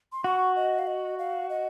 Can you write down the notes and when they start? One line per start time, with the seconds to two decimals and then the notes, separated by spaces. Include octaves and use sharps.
0.12 C6
0.24 F#4 C#6
0.56 D#5
0.79 F5
0.87 D#5
1.18 F5
1.50 D#5